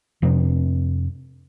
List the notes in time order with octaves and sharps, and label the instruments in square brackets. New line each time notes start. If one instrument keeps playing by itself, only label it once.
[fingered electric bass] F2 C3 C4 D4